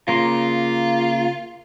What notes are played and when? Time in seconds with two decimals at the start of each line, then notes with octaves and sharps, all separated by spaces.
0.08 C#3 A#3 F4 C6